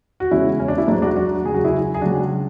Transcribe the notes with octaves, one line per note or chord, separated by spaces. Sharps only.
F#4
E2 C#3 G#3 C#4 E4
C#4
D4
E4
G#2 F#3 D4 F#4
D4 F#4
D4 F#4
C#2 C#3 F#3 G#4
F#4
E4 G#4
G#4
C#2 C#3 F#3 D4 F#4